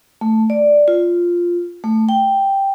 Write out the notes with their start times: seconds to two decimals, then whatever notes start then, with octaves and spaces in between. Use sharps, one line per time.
0.21 A3
0.50 D5
0.88 F4
1.84 A3
2.09 G5